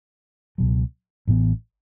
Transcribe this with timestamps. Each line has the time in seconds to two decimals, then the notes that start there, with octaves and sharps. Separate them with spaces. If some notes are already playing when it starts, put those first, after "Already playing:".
0.58 C#2 B2 F#3
1.27 A1 A2 E3 B3